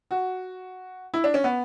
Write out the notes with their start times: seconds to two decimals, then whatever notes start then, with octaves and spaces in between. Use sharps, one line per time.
0.11 F#4
1.14 E4
1.24 D4
1.34 C#4
1.44 B3